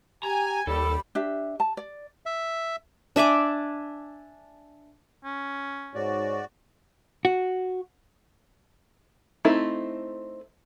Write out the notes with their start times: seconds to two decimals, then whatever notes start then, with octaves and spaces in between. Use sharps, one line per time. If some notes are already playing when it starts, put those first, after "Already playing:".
0.23 G4 G#5 A#5
0.67 D#2 G3 A4 B5
1.15 D4 G4 E5
1.60 A5
1.77 D5
2.26 E5
3.16 D4 E5 G#5 D6
5.25 C#4
5.94 G#2 F#4 C#5 D5
7.25 F#4
9.45 A3 C4 D#4 E4 A4